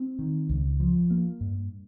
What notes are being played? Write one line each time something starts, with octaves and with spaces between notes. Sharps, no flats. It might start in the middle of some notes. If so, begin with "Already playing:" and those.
Already playing: C4
D#3
C#2
F3
A#3
G2